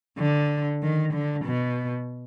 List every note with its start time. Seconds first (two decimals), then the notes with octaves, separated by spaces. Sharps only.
0.19 D3
0.83 D#3
1.14 D3
1.45 B2